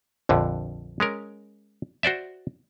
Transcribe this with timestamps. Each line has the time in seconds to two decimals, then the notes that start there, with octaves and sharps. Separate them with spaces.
0.29 A#1 F2 D3
1.00 G#3 C#4 A#4
2.03 F#4 C5 D5 E5